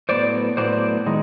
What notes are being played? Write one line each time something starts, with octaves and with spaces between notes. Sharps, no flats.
A2 F#3 B3 C5 D5
A2 F#3 B3 C5 D5
D#3 G#3